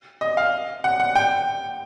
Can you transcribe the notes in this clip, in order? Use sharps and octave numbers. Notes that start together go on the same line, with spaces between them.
D#5
F5
F#5
F#5
G5